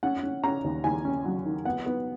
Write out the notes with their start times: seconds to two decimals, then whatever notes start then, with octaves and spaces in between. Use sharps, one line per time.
0.03 C#4 F#5
0.23 C#4
0.44 C#4 A#5
0.64 D#2
0.84 D#2 G#5
1.05 C#4
1.25 F#3
1.45 D#3
1.65 B3 F#5
1.86 B3